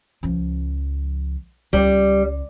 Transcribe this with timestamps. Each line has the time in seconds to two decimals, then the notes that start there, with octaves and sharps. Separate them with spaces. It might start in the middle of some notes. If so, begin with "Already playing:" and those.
0.23 C#2 F3
1.73 C#2 G3